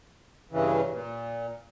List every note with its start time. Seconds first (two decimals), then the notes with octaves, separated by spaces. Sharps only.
0.52 G2 C#3 E3
0.92 A#2